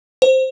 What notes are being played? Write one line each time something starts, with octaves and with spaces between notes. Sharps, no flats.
C5